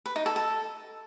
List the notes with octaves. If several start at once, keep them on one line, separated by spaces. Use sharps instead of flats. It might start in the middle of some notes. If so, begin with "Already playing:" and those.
B4
D#4
A4
A4